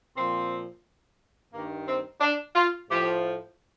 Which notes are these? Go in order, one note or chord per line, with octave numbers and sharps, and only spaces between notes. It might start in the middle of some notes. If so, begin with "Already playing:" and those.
A#2 F3 C4
G2 D#3 A#3
C4
D4
F4
A2 F3 G4